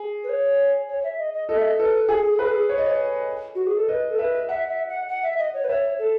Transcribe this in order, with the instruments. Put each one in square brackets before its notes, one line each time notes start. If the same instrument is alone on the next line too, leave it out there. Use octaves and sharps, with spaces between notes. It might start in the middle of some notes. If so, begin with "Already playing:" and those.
Already playing: [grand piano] G#4
[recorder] B4
C#5
C#5
E5
D#5
D#5
[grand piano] A4 [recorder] D#5
[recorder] E5
D#5
[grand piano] A4 [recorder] B4
[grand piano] G#4 [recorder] A4
[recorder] G#4
A4
[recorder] G#4 [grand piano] B4
[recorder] A4
G#4
[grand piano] C#5
D#5
C#5
[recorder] F#4
G#4
A4
[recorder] B4 [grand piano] D#5
[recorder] A4
[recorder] B4 [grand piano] E5
[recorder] E5 [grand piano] F#5
[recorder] E5
F#5
F#5
E5
D#5
C#5
B4
[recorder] C#5 [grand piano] E5
[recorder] A4